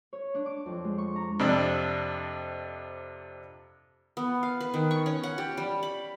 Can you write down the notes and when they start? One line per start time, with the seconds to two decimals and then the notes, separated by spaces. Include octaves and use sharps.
0.13 C#5
0.35 D4
0.46 D6
0.66 F2
0.84 G#3
0.98 C#6
1.16 A#5
1.39 F2 C3 D4 D5 E6
4.17 B3
4.43 F5
4.61 B4
4.74 D#3
4.91 C#6
5.06 C#4
5.24 F#5
5.38 G4
5.57 G3
5.83 B5